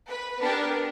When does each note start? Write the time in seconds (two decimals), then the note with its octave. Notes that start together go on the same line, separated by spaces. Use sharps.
0.08 B4
0.40 B3 D4 G4 A#4